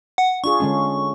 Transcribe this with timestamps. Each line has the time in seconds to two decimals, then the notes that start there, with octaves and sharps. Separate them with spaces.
0.18 F#5
0.44 D4 F4 G#4 C#6
0.60 D3 G#3 C#4